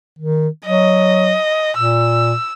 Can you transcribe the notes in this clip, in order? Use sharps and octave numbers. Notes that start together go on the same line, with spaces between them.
D#3
F#3 D#5
A#2 E6